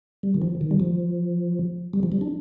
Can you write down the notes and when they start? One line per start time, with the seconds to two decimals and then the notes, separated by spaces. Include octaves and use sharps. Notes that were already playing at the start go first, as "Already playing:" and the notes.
0.23 G3
0.34 D#3
0.42 F3
0.61 D#3
0.71 G3
0.80 F3
1.93 G3
2.03 F3
2.12 G3
2.21 D4